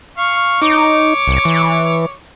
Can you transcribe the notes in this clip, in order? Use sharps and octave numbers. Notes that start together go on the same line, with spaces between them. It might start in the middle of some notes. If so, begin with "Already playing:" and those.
F5 C#6
D#4 C#5 D6
C2
E3